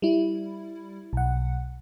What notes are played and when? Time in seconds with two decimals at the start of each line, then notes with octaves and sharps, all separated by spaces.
0.02 G3 E4
1.13 B1 F#5